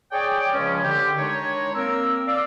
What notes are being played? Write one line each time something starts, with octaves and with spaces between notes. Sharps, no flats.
G#4 C#5 D5 G5
C#2 C#3 F3 G#3 C#4
D3 G4
D#3 G#3 D4 D#4 C#5
A#3 C4 A#4 E6
D5 F5 D6 E6